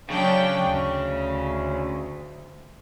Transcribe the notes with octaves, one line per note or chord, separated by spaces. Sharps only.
C#3 F#3 D4 G5
D2